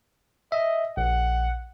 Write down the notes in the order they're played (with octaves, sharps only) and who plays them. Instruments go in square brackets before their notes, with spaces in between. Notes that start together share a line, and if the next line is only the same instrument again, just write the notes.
[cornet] D#5 [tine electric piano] E5
[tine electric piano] A#1 [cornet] F#5